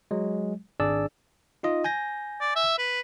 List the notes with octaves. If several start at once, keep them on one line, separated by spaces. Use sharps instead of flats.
F#3 G#3
G#1 D4 G#4 D5 E6
D#4 F4 D#5
G#5 G6 A#6
D5
E5
B4